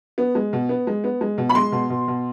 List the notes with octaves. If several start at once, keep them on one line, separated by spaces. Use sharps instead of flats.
B3
G#3
B2
B3
G#3
B3
G#3
B2
B5
G#3 C6
B2
B2
B2